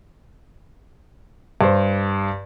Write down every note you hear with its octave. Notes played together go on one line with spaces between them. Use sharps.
G2 C5